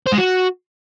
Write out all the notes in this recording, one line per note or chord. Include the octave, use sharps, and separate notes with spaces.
C5
G#3
F#4